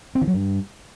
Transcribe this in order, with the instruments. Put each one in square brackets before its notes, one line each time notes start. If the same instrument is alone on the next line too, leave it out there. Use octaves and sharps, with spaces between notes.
[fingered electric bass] C4
D#3
F#3
G2